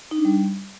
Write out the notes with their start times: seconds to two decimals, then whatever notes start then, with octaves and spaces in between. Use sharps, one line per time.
0.11 D#4
0.18 D4
0.25 G3